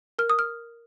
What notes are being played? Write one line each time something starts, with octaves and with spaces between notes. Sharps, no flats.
A#4 F6
D#6
F6